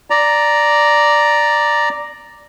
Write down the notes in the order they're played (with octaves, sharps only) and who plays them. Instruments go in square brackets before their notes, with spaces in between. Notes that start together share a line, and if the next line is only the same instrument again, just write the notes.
[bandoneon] D5 A#5